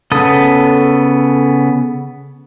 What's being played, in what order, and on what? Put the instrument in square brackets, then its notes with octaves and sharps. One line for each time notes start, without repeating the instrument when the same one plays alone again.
[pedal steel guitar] C#3 B3 A4 D#6